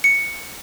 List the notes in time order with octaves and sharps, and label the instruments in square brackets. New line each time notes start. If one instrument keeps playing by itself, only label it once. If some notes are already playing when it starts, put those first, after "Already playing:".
[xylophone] C#7